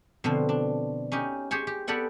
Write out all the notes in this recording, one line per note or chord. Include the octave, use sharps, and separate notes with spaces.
B2 D3 F3 C4
D4
C#4 D#4 G4
G4 G#4 C5 C#5 G#5
G4
B3 G4 A4 D5 F#5 G#5